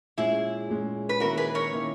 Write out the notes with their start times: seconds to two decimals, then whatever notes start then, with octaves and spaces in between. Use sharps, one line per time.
0.18 A#2 G#3 C#4 E4 G#4
0.69 A#2 G#3 C#4
1.09 B4
1.20 D#3 A#3 C#4 E4 F#4 A#4
1.37 G#4 B4
1.55 A#4 C#5
1.72 D#3 A#3 C#4 E4